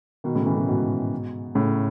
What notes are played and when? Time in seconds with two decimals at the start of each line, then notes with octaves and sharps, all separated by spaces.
0.24 B2 D#3
0.35 A2 C#3
0.46 C#3 E3
0.57 A2 C#3
0.68 G#2 B2
1.55 A2 C#3